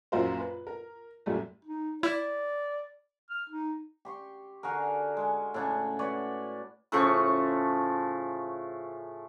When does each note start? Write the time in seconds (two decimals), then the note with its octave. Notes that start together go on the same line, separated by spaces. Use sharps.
0.12 A#1 F#2 F4 A#4 C5
0.40 B4
0.67 A#4
1.26 A#1 F#2 G3 A3
1.65 D#4
2.03 E4 D5
3.30 F6
3.50 D#4
4.05 G4 C6 C#6
4.63 D3 F#4 G#4 A#4
5.17 G#3
5.54 A2 C#3 D4 F#5
5.99 F#4 B4 C#5 D5
6.92 A2 C#3 F3 C#6